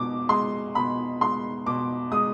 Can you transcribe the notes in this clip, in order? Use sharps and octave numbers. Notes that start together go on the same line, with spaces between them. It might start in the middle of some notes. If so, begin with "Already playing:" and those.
Already playing: B2 G#3 D6
G#3 C6
B2 B5
G#3 C6
B2 D6
G#3 D#6